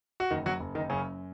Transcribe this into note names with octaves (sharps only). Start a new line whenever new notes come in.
F#4
F#1 D#3 D#4
F#3 F#4
F#1
D#3 D#4
F#2 C#3 C#4